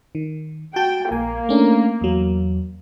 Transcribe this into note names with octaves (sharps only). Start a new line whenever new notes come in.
D#3
F#4 G5 A5 G6
A#1 A#3 G#5
A3 C#4 D4
E2 F#3